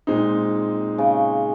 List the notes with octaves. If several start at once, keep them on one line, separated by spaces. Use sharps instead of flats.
A#2 G#3 C4 D#4
C#3